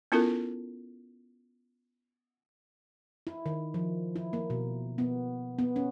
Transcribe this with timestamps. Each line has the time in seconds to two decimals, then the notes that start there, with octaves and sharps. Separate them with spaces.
0.12 B3 C#4 E4 F4 A4 A#4
3.27 E4
3.46 D#3
3.74 F3
4.16 E4
4.33 A#3
4.50 B2
4.98 B3
5.58 B3
5.76 C#4